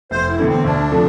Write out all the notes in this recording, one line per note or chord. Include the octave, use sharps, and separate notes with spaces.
F1 C5
E4
E2 D3 A3
C4
D2 D4
C3 F3 A3